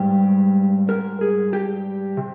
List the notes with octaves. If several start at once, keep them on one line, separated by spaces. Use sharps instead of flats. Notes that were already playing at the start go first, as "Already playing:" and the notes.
Already playing: G#2 G3 G4
A#4
G#4
G4
C3